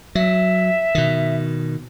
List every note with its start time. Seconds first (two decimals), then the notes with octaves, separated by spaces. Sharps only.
0.15 F#3 E5
0.95 B2 D#3